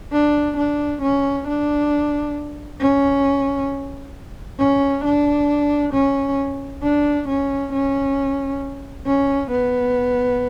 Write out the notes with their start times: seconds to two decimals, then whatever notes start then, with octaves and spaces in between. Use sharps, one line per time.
0.13 D4
0.57 D4
1.02 C#4
1.47 D4
2.81 C#4
4.59 C#4
5.04 D4
5.94 C#4
6.83 D4
7.28 C#4
7.73 C#4
9.06 C#4
9.51 B3